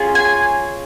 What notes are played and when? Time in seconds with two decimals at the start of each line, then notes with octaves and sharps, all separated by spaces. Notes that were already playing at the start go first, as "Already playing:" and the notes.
Already playing: C#4 F4 G#4
0.15 G#5